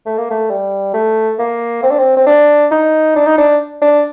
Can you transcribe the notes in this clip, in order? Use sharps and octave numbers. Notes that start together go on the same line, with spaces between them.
A3
A#3
A3
G3
A3
A#3
C4
D4
C4
C4
D4
D#4
D4
D#4
D4
D4